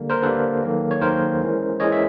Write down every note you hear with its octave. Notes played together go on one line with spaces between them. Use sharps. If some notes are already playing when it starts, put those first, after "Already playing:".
Already playing: D3 G3 A#3
A#4 C5
D3 G3 A#3 A4 B4
D#3 F#3 A#3
C#5
D#3 F#3 A#3 A#4 C5
E3 G#3 C#4
E3 G#3 C#4 C#5 D#5
E5